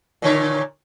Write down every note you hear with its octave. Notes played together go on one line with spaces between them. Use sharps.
A#2 D3 C#5